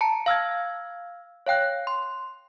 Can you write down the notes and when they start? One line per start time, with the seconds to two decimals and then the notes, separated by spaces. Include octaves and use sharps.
0.01 A5 A#5 C#7
0.26 F5 E6 F6 G#6
1.46 C#5 F5 G5 F#6
1.87 C6